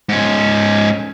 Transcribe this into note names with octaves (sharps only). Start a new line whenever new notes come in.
G#2 C#4